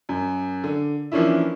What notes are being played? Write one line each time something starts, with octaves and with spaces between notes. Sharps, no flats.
F#2
D3
E3 F3 A#3 C#4 D4 E4